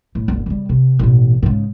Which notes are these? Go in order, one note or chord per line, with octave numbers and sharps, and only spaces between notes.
A2
G1 D2
C#3 G3
C3
A1 B2
G#2 C#3